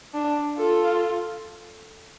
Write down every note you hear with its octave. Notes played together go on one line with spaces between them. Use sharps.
D4
F4 A4